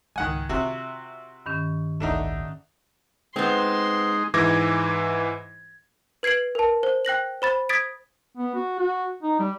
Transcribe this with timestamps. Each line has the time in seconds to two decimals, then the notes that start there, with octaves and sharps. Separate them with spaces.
0.16 C#2 G#2 D#3 F#5 G#5
0.49 C3 F4 F#4 E5
1.46 G2 D#3 C#4
2.00 A1 D2 A3 D4 D#4 E5 F#5
3.36 G#3 B3 C4 D#4 C6
4.34 G#2 E3 D6 G#6 A#6
6.23 B4 G#6 C7 D7 F#7
6.55 A#4 A5
6.83 C5
7.05 G5 F#6 A#6 F#7
7.42 C5 B5 A6
7.69 D#6 G#6 A6 B6 D7
8.37 B3
8.55 F#4
8.79 F#4
9.23 D#4
9.39 G3